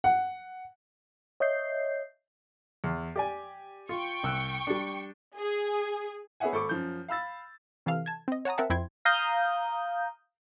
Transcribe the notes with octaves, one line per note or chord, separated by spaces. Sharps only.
F#5
C#5 D#5 E5 G6 C7
E2
G4 D5 G#5
F4 G5 C#6
C2 E6 F#6
G3 D4
G#4
B3 G#4 C#5 E5 F#5 G#5
G#1 A4 B5 C#6 D6
F#2 F3 G6
F5 B5 E6 A6
C3 E3 A4 F5 F6
A5 G#6
C4 D#5
C#5 F#5 A5 A#5 D#6
C4 A#4 E5 F#5 A5
F2 C4 E4 G5 C6 G#6
F5 A#5 D#6 G6